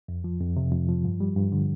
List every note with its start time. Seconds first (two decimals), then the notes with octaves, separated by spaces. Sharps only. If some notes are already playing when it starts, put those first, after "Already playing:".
0.08 F2
0.24 F3
0.40 F2
0.56 C3
0.72 F2
0.88 F3
1.04 G2
1.20 G3
1.36 G2
1.52 D3